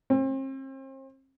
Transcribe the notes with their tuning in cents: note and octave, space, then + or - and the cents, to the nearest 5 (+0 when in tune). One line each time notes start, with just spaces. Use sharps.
C4 +40